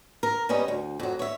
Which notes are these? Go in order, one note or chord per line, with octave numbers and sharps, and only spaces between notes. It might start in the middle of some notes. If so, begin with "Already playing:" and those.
A#4
G3 B3 C#4 D#5
D2
F2 F#3
C#5 E5